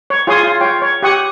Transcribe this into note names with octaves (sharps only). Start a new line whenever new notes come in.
C#5
F4 G#4 C#5 G#5 C6 D#6
F4
F4 C#5 G5
C#5
G4 F#5 C#6 D#6